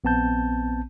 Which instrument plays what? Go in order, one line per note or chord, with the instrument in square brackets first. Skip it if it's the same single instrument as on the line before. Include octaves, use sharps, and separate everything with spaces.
[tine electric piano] A#1 B3 C4 A5 G6